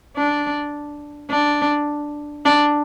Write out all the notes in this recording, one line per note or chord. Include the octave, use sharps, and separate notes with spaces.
D4
D4
D4